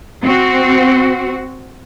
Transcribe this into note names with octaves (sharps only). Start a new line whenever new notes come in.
C4 F#4